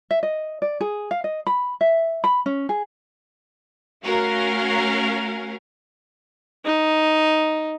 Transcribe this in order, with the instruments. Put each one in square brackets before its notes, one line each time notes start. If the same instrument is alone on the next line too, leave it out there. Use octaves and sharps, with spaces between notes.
[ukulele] E5
D#5
D5
G#4
F5
D#5
B5
E5
B5
C#4
G#4
[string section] A3 C#4 F#4 A#4 F5
[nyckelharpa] D#4